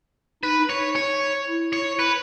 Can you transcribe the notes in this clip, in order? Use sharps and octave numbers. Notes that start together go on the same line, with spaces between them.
D#4 B4
C#5
C#5
E4
C#5
B4